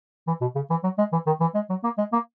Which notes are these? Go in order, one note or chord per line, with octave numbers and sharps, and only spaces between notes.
E3
B2
C#3
E3
F#3
G#3
E3
D#3
E3
G#3
F#3
A#3
G#3
A#3